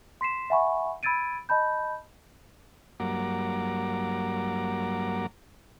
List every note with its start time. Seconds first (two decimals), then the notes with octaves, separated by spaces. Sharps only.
0.21 C6 B6 C7 E7
0.50 E5 F#5 G#5 B5 C#6
1.03 B5 E6 G#6 A6 D7 D#7
1.49 D#5 A5 B5 G6
3.00 G2 F#3 A#3 F#5 A#5 D6